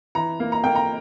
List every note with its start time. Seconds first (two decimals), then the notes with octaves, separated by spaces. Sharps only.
0.15 E3 A#5
0.40 A#3
0.52 A#5
0.64 A#3 G5
0.75 A#5